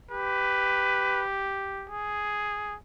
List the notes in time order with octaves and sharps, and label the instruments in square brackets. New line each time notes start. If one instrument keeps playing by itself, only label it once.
[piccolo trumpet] G4 [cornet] B4
[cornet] G#4